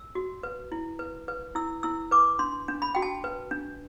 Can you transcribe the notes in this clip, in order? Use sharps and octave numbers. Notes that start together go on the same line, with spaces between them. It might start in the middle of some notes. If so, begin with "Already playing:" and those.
Already playing: E6
F#4
B4
E4
B4
B4
E4 E6
E4 E6
B4 D6
D4 C6
D4
B5
F#4 G5
A5
B4
D4